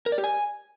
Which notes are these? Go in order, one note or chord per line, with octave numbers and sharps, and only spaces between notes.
A#4
D5
G4
G#5